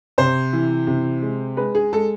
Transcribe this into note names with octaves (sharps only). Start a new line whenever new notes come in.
C3 C5
E3
C3
G#3
G#3 B4
G#4
G#3 A4